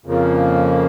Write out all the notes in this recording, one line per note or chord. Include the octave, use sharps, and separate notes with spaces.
F2 C#3 F3 A#3